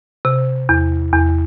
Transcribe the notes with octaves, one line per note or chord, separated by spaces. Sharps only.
C3
E2
E2